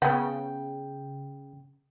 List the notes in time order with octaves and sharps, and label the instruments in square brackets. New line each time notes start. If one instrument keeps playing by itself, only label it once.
[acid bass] C#3 [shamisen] B3 F#5 [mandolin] G5